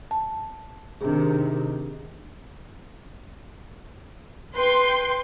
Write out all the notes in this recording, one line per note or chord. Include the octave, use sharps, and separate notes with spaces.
A5
C3 D#3 D4 G#4
B4 G5 C6